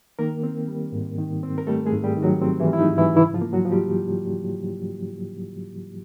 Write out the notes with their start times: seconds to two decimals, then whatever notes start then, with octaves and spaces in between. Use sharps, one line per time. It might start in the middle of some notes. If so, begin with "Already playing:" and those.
0.19 D#3 A#3 A#4
0.43 C4
0.68 G3
0.92 G#2
1.18 D#3
1.43 C4
1.58 A#4
1.67 G3 A3 A4
1.86 G#3 G#4
1.93 G#2
2.04 G3 G4
2.17 D#3
2.23 F#3 F#4
2.42 C4
2.60 E3 E4
2.66 G3
2.73 E4
2.79 D#4
2.91 G#2
2.98 E3 E4
3.16 C#3 E3 E4
3.34 F3 F4
3.41 A#3
3.53 F#3 F#4
3.65 F3
3.72 G3 G4